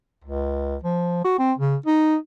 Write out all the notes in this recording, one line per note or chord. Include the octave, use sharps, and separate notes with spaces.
C#2
F3
F#4
C4
C#3
D#4